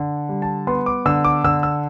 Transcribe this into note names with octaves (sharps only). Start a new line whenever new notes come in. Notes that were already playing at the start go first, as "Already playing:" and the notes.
Already playing: D3
G3
A5
B3 C6
D6
D3 E6
D6
D3 E6
E6